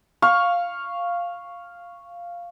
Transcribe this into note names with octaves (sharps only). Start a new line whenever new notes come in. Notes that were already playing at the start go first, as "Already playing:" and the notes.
F5 C#6